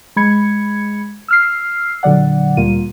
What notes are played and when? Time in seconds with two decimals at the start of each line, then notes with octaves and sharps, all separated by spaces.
0.16 G#3 B5 G#6 C#7
1.28 E6 F6 C7
2.03 A#2 D3 F#3 D5 F#5
2.57 D2 A#2 G3 A#3 F4 D#7